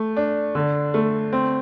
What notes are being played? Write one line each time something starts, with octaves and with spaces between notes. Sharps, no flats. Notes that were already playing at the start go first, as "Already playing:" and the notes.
Already playing: A3
D4
D3
A3
C4